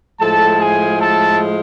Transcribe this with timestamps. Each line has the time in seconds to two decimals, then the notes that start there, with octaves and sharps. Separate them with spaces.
0.20 A2 F3 G#3 A4 A5
0.60 G#4 G#5
0.99 A4 A5